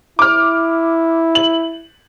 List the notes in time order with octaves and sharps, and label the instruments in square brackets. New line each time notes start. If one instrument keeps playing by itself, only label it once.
[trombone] E4 [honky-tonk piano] D6 F6
[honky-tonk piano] F#7